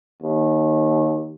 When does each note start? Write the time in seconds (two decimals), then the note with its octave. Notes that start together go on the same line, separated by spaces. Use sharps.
0.22 D#2